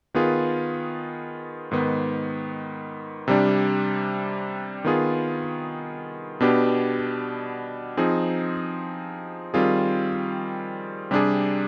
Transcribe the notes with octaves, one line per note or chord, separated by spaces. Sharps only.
D#3 B3 F4 G#4
G#2 D#3 B3
C3 G3 D4
D#3 B3 F4 G#4
B2 B3 D4 G4
F3 C4 D#4 G#4
D#3 G3 C4 F4 G#4
C3 G3 D4 G#4